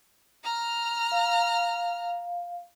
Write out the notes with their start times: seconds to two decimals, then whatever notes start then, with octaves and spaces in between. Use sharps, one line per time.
0.44 A#5 F6
1.12 F5